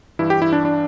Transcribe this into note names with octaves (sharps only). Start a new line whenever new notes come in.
G2 E3 E4
G4
E4
D4
D4